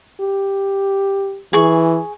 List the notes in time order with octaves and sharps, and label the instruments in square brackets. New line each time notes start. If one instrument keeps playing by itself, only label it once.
[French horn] G4
[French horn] E3 [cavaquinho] G#4 C#6